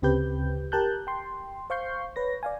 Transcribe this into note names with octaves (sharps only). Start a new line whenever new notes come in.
D2 C#3 C4 G4 B4 G6
G4 A#4 A5 F#6 G6
G5 C6
C5 F5 C#6 G6 C7
B4 C#5 A#6
D5 F5 G#5